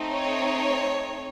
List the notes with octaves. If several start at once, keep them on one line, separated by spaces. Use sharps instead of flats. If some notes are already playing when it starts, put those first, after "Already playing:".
Already playing: A3 C4 D#4
C#5